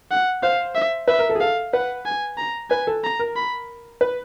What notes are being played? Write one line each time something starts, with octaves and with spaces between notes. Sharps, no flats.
F#5
C5 F5
E5
B4 E5
A#4
A4
G#4
A4 F5
B4 F#5
G#5
A#5
B4 G#5
A4
A#5
A#4
B5
B4